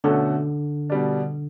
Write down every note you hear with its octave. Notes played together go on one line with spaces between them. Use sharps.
B2 D3 A3 C#4 F#4 A4
B2 G3 D4